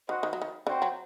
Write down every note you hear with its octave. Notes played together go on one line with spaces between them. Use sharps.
D#3 F#4 C5 D#5 F#5
D#3
F#3
D#3
D3 C4 F#4 C5 G5
F#3